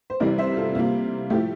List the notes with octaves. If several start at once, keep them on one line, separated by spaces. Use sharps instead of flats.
C5
C3 E3 G3 A#4 D5
C5 E5
F4 A4
C3 G3 A#3 F4
A2 F3 A3 E4 G4